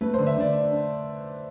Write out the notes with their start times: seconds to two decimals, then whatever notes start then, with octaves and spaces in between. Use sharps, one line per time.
0.01 A3 B4
0.14 D3 C5
0.26 E5
0.36 D3 D5
0.53 D4
0.71 D4